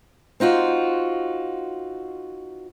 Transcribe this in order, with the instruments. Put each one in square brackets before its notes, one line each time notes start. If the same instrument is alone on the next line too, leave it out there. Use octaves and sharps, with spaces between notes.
[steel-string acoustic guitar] C4 D#4 F4 F#4